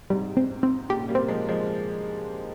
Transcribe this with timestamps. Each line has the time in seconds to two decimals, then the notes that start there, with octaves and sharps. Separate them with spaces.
0.10 G#2 C3 G3
0.37 C4
0.63 C4
0.89 A#2 C#3 G4
1.09 G3 A#3
1.15 C4
1.28 F3 G#3
1.48 F3 G#3